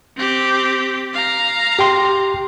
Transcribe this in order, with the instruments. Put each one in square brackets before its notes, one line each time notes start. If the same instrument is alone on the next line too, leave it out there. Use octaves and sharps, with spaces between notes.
[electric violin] C4 G4
F5 A#5
[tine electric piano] G4 G5 C6